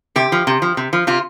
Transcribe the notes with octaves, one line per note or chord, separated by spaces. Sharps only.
C3 G4
F3
C3
F3
C3
F3
C3 F4